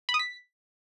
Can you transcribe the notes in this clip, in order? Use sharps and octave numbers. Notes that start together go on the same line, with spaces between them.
B5
D#6
B6